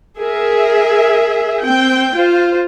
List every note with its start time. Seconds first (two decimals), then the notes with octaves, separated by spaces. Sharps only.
0.19 G#4 A#4 E5
1.63 C4 G5
2.15 F4 C5